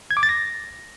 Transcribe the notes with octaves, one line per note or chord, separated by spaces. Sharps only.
G#6
D6
A6
A#6